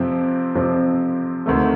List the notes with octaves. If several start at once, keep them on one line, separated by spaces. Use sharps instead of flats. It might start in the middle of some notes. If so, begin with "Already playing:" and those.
Already playing: F2 C3 F3 C4
F2 C3 F3 C4
D2 C3 D#3 A3